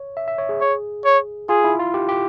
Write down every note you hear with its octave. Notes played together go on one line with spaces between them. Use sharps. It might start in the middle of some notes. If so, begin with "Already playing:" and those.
Already playing: C#5
E5
E5
C#5
G#4
C#5
C#5
F4 G#4
E4
F4
G4
G4